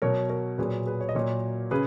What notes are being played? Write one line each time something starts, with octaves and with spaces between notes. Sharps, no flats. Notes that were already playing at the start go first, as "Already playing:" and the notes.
B2 F#3 A#4 C#5
A#4 C#5
A#2 F#3 G#4 B4
G#4 B4
C#5
D#5
A#2 F#3 A#4 C#5
C#3 G#4 B4